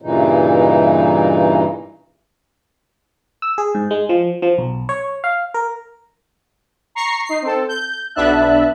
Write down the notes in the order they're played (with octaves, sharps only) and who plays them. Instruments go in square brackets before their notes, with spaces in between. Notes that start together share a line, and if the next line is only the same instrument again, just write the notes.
[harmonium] G2 A#2 C#3 E3 D#4
[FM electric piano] E6
G#4
G#2
G#3
F3
F3
B1
C#5
F5
A#4
[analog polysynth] A#5 C#6 C7
D#4 C7
C4 A4
G6
B1 B3 D4 E5 A5 F#6